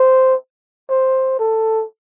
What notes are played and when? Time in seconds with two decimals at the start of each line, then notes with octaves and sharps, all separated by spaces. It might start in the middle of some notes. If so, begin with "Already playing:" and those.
Already playing: C5
0.89 C5
1.39 A4